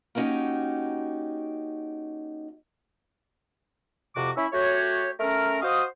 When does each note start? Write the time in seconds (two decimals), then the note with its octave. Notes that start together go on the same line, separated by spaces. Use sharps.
0.15 A#3 B3 C#4 D#4 F#4 G4
4.16 F2 C3 F#4 D6
4.37 C#4 E4 E5
4.53 A3 F#4 G4 C#5
5.20 A3 C#4 A#4
5.62 F#4 C5 D#5 F5 D#6